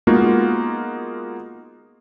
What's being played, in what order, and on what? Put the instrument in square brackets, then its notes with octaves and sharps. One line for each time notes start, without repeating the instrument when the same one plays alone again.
[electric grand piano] G#3 A#3 B3 D#4 F4 F#4